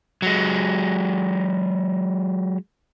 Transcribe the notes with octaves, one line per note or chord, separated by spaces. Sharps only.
F#3 G#3